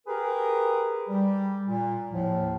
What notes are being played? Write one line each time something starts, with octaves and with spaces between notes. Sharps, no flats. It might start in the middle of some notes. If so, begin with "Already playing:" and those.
G4 G#4 A#4 B4
G3
A#2
D#2 A2 F3